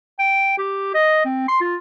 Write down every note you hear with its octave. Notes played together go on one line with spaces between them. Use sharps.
G5
G4
D#5
C4
C6
F4